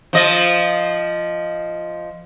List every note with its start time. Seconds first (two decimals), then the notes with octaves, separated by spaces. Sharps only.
0.13 F3 D#5